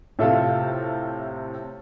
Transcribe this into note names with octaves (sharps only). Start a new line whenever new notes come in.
A2 C3 F4 A4 E5